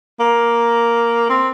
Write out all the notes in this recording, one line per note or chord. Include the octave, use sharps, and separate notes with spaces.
A#3
C4